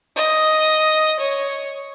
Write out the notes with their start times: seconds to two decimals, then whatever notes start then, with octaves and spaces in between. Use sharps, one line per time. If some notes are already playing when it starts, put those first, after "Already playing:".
0.16 D#5
1.19 C#5